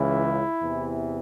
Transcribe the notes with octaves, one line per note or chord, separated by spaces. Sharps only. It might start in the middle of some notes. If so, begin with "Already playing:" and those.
Already playing: C#2 C#3 E3 E4
E2 C3 E3